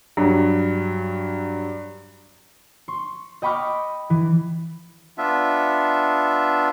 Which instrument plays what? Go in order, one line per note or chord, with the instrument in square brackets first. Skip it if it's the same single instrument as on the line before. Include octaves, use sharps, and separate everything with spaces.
[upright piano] G2 F#3
[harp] C6 C#6
D#5 G5 B5 C#6 D6 F6
E3
[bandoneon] B3 D4 F4 E5